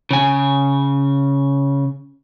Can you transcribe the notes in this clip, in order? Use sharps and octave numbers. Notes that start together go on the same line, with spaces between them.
C#3 G#5